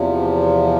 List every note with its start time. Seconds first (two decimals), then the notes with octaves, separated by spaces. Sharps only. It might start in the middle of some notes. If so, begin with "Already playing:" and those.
Already playing: E2 C3 F3